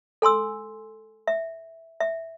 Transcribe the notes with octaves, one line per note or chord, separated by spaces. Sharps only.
A4 G#5 C6 E6
E5
E5